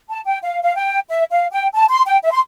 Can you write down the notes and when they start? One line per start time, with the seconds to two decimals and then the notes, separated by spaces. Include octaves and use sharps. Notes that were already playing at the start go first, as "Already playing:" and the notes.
0.10 A5
0.27 G5
0.43 F5
0.64 F5
0.76 G5
1.09 E5
1.31 F5
1.52 G5
1.74 A5
1.90 C6
2.07 G5
2.23 E5
2.31 C6